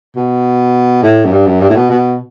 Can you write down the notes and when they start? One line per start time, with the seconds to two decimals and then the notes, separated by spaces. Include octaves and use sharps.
0.17 B2
1.03 A2
1.25 F#2
1.32 G2
1.47 F#2
1.61 G2
1.70 A2
1.76 B2
1.90 B2